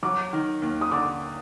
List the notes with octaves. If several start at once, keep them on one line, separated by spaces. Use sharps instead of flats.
F#3 D6
D#3
D#2
D#6
D3 D6